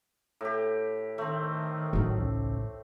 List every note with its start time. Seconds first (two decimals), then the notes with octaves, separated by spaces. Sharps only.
0.41 A2 G4
1.18 D#3 A3 C4
1.93 A1 F#3 D#4
2.18 C#2